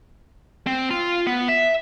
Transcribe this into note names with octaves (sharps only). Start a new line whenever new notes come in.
C4
F4
B3
E5